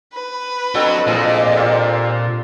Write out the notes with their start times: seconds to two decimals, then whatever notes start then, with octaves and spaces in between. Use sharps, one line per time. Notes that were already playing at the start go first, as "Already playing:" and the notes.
0.14 B4
0.75 F#3 C4 D4 A4 D#5
1.07 A#2 F3 G#4 A4 C5 D5
1.57 F4 G4